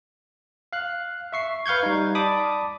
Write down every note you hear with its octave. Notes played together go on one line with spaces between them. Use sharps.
F5 F#6
E5 C#6 C7
B4 F5 C#6 G6 G#6
G3 D#4
D5 A5 B5 D6 D#6